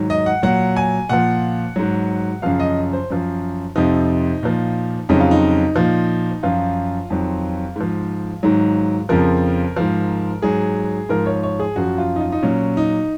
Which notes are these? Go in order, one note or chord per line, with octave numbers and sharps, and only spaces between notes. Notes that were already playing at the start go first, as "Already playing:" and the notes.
Already playing: G#2 D#3 F#3
D#5
F#5
A#2 F#3 F#5
G#5
A#2 F3 F#5
G#2 F#3
F#2 C#3 F3 F5
D#5
C5
F#2 F3
F2 C3 F3 D#4
A#2 F3
F2 C#3 F#3 D#4
F4
D#4
A#2 F3
F#2 F3 F4
F2 D#3 F#3
G#2 F3
G#2 D#3 F#3
F2 C#3 F3 A#4
G#2 F3
G#2 F#3 G#4
G#2 F3 A#4
C#5
C#5
G#4
F#2 F3 F#4
F4
D#4
F4
D#4
A#2 F#3 C#4
D#4